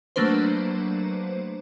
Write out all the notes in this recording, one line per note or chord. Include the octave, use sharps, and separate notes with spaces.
F#3 A3 A#3 D4 B4 C5